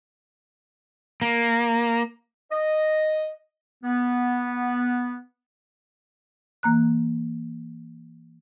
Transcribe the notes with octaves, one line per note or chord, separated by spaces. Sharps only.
A#3
D#5
B3
E3 A#3 A#5 F#6